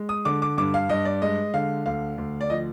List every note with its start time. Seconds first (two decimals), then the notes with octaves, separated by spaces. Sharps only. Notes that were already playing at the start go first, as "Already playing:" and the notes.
Already playing: G#3
0.09 D#6
0.25 D3 D6
0.42 D6
0.58 G2 D6
0.74 F5
0.89 G2 D#5
1.05 D5
1.22 G#3 D#5
1.54 D3 F5
1.86 D2 F5
2.18 D2
2.41 D5
2.50 F3 D#5